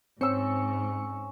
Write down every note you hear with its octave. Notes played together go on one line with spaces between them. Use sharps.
G#2 C4 C#4 E6 C#7